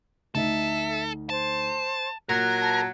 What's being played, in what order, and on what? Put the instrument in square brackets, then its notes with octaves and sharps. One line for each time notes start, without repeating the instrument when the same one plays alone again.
[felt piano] D2 D#4 [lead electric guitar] A4 [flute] E5
[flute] C5 [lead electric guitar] A5
[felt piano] A#2 [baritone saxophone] F#3 [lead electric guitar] A#4 [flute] F#6
[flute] A5